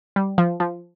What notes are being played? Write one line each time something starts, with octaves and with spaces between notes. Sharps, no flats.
G3
F3
F3